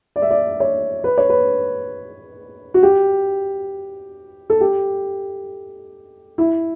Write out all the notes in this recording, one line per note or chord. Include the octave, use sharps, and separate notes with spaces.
D5
E5
D5
C#5
B4
C#5
B4
F#4
G4
A4
G4
E4